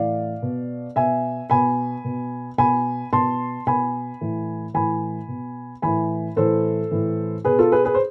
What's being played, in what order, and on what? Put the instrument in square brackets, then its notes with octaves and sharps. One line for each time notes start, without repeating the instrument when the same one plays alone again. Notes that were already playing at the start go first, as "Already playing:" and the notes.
Already playing: [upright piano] A2 E3 D5 F5
B2
B2 E5 G#5
B2 G#5 B5
B2
B2 G#5 B5
B2 A5 C6
B2 G#5 B5
A2 E3
A2 E3 G#5 B5
B2
A2 E3 G#5 B5
A2 E3 A4 C5
A2 E3
B2 G#4 B4
F4 A4
G#4 B4
G#4 B4
C5